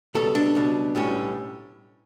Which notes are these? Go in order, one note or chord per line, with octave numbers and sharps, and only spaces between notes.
C#2 B2 G3 A4
D4
C#2 B2 G3
B1 A2 G3 C#4